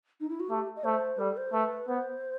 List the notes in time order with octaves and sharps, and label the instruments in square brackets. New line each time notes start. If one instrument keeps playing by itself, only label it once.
[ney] D#4
E4
F#4
[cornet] A3 [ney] G4
[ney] D#5
[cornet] A3 [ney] C5
[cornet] G3 [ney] A4
[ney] C5
[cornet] A3 [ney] B4
[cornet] B3 [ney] C5